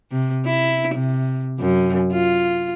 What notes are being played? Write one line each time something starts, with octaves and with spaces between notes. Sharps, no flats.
C3
E4
C3
F#2
F4